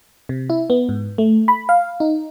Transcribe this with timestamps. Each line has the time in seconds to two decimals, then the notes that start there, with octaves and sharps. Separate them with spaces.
0.29 C3
0.50 E4
0.70 B3
0.89 G#2
1.18 A3
1.48 B5
1.69 F5
2.00 D#4